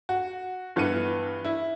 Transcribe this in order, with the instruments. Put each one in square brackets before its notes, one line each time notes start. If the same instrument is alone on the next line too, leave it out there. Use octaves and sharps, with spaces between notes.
[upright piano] F#4
G2 E3 B3 C#7 D#7
E4